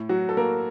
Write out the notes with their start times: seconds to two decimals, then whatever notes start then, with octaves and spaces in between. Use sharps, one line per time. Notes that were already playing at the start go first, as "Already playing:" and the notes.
Already playing: A2
0.09 F#3 F#4
0.29 A4
0.37 A#3 A#4